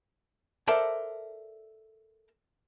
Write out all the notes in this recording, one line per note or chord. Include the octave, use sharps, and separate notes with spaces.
A4 A#4 C5 D5 E5 A5